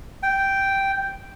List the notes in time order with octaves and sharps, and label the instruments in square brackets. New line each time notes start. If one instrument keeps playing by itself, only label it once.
[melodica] G5